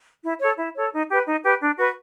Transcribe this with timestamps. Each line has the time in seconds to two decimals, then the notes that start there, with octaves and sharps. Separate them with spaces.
0.24 E4
0.40 A4 C#5
0.58 E4
0.74 A4 C#5
0.92 D#4
1.09 G4 B4
1.26 D#4
1.43 G4 B4
1.60 D4
1.77 F#4 B4